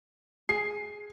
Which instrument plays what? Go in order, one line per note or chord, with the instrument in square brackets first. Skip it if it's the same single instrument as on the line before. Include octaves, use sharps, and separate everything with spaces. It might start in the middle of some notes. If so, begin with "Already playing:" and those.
[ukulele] G#4 [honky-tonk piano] C7